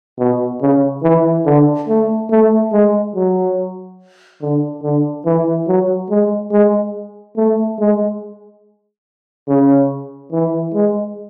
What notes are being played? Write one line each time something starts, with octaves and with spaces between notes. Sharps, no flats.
B2
C#3
E3
D3
A3
A3
G#3
F#3
D3
D3
E3
F#3
G#3
G#3
A3
G#3
C#3
E3
G#3